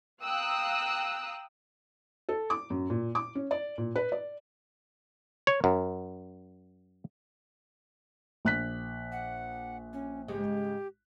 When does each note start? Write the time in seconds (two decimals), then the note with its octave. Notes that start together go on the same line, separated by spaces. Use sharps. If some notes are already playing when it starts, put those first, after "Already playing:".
0.23 F5 G5 A#5 D#6 E6 F#6
2.29 A4
2.50 D6
2.70 F#2
2.90 A#2
3.15 D6
3.35 C#4
3.51 D5
3.78 A#2
3.96 B4
4.12 D5
5.47 C#5
5.64 F#2
8.45 A#1 F#6 B6
9.12 F#5
9.93 C#4
10.28 G#2 C#3 G#3 G4